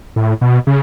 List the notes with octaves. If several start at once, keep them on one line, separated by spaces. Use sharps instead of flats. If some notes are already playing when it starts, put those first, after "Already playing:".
A2
B2
C#3